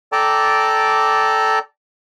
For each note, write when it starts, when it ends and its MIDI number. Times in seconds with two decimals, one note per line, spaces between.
0.12 1.59 69
0.12 1.59 74
0.12 1.59 79
0.12 1.59 81
0.12 1.59 82
0.12 1.59 86